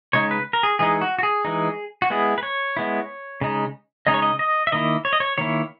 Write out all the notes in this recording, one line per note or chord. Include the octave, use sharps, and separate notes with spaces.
C#3 G#3 D#4 C#5
B4
A#4
G#4
E3 G#3 D#4 G#4
F#4
F#4
G#4
E3 G#3 D#4
F#4
G#3 B3 E4 G#4
B4
C#5
G#3 B3 E4
C#3 G#3 D#4
C#3 G#3 D#4 D#5
C#5
D#5
D#5
E5
D#3 A#3 E4 D#5
C#5
D#5
C#5
D#3 A#3 E4 C#5